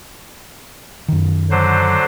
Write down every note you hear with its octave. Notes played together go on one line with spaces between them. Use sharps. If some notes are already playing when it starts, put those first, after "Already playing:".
F#2 D#3
D3 F#3 C5